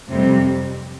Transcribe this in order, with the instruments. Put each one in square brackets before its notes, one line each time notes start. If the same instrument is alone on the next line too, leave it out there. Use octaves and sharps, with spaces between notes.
[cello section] F2 C3 G3 C4